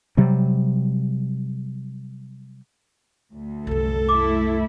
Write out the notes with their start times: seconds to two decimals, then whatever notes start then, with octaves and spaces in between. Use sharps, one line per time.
0.17 C3 F#3 G3
3.33 D2
3.67 C2 F#2 A4
4.09 A3 E4 D6